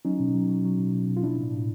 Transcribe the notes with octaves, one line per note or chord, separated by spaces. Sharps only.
F#3 C#4 D#4
B2
F#3
F#3
F#3
B2
B2
B2
F4
F3 D4 E4
A2
A2